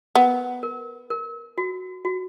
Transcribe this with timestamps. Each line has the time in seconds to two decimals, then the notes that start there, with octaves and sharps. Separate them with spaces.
0.15 B3 A#4
0.63 A#4
1.10 A#4
1.58 F#4
2.05 F#4